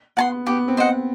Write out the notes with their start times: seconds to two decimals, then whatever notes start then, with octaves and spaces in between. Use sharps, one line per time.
0.17 B3 F#5 A5 C6
0.47 B3 G4
0.68 C4
0.77 B3 C5 D#5 F#5